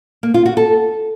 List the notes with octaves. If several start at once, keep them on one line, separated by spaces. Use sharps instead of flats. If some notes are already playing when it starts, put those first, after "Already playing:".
A#3
F4
F#4
A4